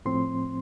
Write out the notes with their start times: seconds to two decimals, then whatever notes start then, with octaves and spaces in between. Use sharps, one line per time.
0.05 A2 F3 C4 C6